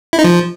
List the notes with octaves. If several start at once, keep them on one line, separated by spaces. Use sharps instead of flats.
E4
D#4
F3